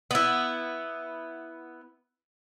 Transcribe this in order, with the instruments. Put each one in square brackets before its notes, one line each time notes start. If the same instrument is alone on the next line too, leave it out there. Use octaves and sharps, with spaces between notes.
[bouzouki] B3 E4